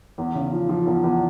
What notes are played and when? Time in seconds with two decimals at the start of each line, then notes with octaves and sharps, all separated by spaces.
0.18 E2
0.35 C#3
0.52 F3
0.69 F3
0.87 E2
1.04 E2